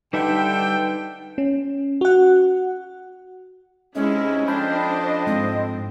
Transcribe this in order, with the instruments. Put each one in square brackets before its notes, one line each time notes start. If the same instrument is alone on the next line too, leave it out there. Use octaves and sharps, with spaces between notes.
[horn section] D3 G5 [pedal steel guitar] G3 A4 E5 [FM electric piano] D#4 B4
[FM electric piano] C#4
F#4 F#5
[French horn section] G#2 C3 D#5 [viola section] G#3 E4 [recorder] C#4
[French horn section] F3 A4 D#5 [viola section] D4 C5 [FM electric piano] G5 A5 B5
[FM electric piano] G#2 [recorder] C4